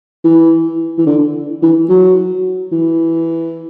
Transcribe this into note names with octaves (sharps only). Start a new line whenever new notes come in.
E3
E3
D3
E3
F#3
E3